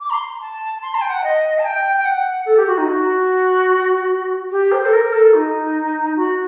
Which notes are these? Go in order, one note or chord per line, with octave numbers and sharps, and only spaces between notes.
D6
A#5
C6
A5
C6
A5
G5
F#5
D#5
A5
G5
G5
F#5
A4
G4
F#4
D#4
F#4
G4
C5
A4
A#4
A4
D#4
F#4